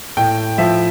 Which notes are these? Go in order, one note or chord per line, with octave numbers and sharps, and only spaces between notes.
A2 G5
F3 E5